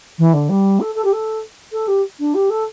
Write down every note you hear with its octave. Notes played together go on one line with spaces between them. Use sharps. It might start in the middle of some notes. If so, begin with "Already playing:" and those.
E3
D3
G3
A4
A4
G4
A4
A4
G4
D4
G4
A4